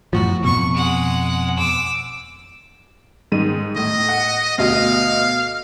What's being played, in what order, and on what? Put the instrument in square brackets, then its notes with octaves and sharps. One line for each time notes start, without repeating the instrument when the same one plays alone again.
[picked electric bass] F#2 A2 F3 [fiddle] F#4
[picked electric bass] F2 B2 [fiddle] C#6
[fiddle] G#3 F#5
D6 E6
[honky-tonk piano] G#2 D#3 D#7
[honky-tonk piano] A2 [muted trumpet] D#5
[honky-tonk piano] F#5
[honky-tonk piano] D2 B2 D#5 [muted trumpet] F5